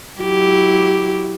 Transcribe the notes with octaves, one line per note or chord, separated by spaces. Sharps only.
F#3 E4 G4